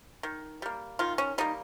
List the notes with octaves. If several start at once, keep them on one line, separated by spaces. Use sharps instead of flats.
D#3
G3 A#3
D#3 F4
C#4
G3 A#3 D#4